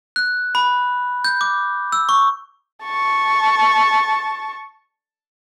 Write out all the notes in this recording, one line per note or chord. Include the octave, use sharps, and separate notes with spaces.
F#6
B5
G6
D6
E6
C#6
A5 C#6